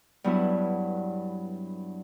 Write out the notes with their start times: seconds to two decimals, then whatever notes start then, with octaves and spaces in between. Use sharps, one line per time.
0.24 G2 F#3 B3 E4